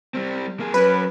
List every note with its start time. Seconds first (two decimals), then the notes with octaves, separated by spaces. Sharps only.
0.14 G3 C4
0.60 A#3 G#4
0.74 F#3 C#4 B4